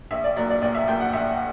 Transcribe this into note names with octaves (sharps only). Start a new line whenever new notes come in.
A#1 E5
D5
A#2 F#3 D5
D5
A#1 D5
E5
A#2 F#3 G5
F#5
A#1 E5